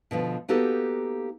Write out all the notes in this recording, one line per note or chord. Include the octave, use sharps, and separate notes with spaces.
B2 D3 F3
A#3 B3 D#4 F#4 G4 A4